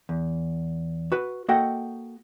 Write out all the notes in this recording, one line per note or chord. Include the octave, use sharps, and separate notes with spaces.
E2
F#4 B4
A#3 F#4 A4 D#5 F#5 G5